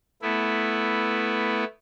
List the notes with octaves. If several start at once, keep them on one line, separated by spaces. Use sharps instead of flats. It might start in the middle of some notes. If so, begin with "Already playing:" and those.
A3 B3 E4